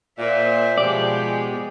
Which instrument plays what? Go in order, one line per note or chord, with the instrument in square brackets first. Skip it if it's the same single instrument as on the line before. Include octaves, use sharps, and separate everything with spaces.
[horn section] A#2 [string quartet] C5 E5
[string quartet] B2 G3 G#3 [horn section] F3 G4 [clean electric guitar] D5